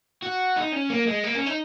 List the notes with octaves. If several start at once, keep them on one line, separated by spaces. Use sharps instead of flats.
F#4
D#4
C#4
A#3
G#3
A#3
C#4
D#4